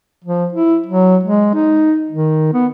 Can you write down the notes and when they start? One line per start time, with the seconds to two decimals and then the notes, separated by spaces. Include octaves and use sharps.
0.24 F3
0.53 E4
0.86 F#3
1.23 G#3
1.54 D#4
2.10 D#3
2.53 B3